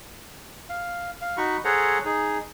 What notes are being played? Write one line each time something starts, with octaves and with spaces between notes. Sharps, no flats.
F5
F5
D#4 F#4 B5 C#6
G#4 A4 C5 C#5 F#5 A#5
D#4 G#4